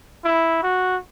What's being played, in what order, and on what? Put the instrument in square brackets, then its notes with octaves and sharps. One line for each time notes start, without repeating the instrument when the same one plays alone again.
[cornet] E4
F#4